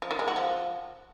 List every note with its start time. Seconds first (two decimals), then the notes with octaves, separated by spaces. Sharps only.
0.02 F3
0.11 D#3
0.19 G#3
0.28 F#4
0.36 F3